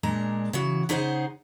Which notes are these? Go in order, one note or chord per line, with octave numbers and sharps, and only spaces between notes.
A#2 G#3 D4 A#5
C#3 E3 F#4
C#3 D#4 G#4 C5 C#5 F#5